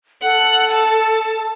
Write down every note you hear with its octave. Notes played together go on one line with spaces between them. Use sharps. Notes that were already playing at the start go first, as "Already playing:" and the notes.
A4 F#5
A5